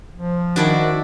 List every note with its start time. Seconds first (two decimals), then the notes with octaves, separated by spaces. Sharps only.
0.15 F3
0.56 D#3 D4 E4 F#4 D5